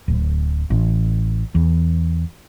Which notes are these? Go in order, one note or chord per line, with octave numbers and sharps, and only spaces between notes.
D1
A1
E2